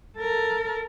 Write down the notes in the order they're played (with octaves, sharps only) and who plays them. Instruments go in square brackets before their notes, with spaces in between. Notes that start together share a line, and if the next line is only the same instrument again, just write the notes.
[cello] A4 A#4